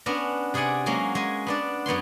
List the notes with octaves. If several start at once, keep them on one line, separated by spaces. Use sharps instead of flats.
B3 C#4 D4 A#4
C3 G#4 D5 F#5 G#5
F#3 G#3 A#3 C#4 F#4
G#3 G#5
B3 D4 D5
F#2 B3 C#5 C6